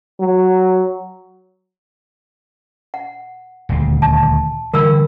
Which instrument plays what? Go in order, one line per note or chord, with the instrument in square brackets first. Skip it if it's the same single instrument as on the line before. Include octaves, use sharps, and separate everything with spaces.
[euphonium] F#3
[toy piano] F#5
[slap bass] D#1 D2
[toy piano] A5
[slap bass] D3 E3 G3 [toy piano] A#4 B5 E6